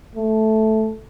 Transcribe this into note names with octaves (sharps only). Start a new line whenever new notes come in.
A3